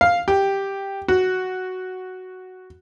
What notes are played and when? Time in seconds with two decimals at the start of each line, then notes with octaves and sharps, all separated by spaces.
0.01 F5
0.28 G4
1.08 F#4